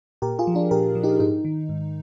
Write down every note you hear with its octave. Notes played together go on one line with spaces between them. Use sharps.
A#2 G4 A#4
F4 G#4
F3
D4 F4
A#2 G4 A#4
F3
D#4 G4
G#2 D#4
D#3
G#2